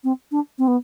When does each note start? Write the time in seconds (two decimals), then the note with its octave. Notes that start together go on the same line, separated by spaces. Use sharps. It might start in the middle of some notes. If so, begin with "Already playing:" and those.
0.04 C4
0.31 D4
0.58 C4
0.67 B3